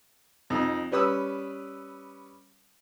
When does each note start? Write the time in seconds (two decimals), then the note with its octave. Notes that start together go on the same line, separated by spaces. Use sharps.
0.50 F2 D#4
0.92 G3 C#4 B4 D#6 E6